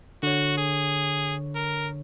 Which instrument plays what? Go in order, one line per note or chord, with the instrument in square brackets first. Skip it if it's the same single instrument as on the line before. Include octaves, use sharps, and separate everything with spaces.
[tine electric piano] D3 C#5 [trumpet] F#4
[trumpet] G#4
A#4